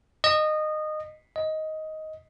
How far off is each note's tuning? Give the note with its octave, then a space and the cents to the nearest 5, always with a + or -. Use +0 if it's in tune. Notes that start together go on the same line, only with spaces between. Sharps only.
D#5 -20
D#5 +10